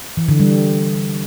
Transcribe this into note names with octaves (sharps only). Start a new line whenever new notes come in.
E3
D3
G3